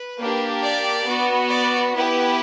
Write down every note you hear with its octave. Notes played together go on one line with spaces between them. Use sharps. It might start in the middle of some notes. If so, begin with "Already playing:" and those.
Already playing: B4
A#3 D4 G4
D5
B3 F#4
D5
B3 E4 G4 B4